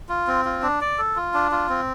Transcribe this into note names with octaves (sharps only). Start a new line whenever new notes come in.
F4
C4
F4
D4
D5
A4
F4
D4
F4
C4